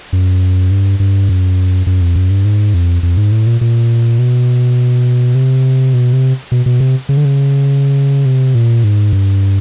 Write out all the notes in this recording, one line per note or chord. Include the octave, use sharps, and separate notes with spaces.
F#2
G2
G2
F#2
F#2
F2
F#2
G2
G#2
F2
F2
G#2
A2
A#2
A#2
B2
C3
B2
C3
B2
B2
C3
C#3
D3
C#3
C3
A#2
G#2
G2